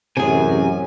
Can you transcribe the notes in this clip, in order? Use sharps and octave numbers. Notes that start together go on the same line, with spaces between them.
A1 F#2 C3 G#4 G#5